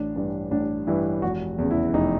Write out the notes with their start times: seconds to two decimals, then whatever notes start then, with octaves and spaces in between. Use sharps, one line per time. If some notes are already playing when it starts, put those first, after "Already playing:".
Already playing: A1 D4
0.16 G2 E3 D4
0.51 A1 D4
0.87 G2 E3 E4
1.22 F1 F#4
1.58 E2 C#3
1.71 E4
1.94 F1 D#4